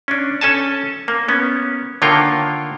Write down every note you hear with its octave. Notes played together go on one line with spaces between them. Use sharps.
C#4 D4
C#4 A4 G#5 A5
A#3
B3 C#4
D3 D#3 A#3 F4 C#5 G5